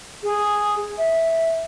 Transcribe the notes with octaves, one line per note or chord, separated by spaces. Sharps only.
G#4
E5